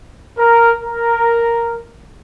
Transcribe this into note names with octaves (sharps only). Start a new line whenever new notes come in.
A#4
A#4